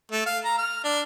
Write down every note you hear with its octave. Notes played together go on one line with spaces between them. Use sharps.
A3
F5
A#5
F6
D4